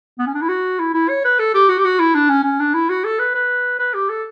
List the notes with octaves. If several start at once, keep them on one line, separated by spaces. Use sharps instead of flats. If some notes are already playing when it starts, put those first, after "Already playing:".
B3
C#4
D4
E4
F#4
E4
E4
C#5
B4
A4
G4
F#4
G4
F#4
E4
D4
C#4
C#4
D4
E4
F#4
A4
B4
B4
B4
G4
A4